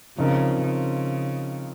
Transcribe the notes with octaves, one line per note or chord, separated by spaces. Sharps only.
C#3 F3 C4 D#4 A#4
C#3